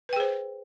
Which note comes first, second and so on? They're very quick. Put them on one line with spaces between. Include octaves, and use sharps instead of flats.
B4 G5 G#4 C5